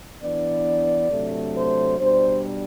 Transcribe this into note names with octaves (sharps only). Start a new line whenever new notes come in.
E3 B3 D4 D5
C3 F#3 A3 D4
C5
B2 G3 D4 C5